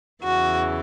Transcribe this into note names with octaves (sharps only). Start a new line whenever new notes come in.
E2 C#3 E3 F#4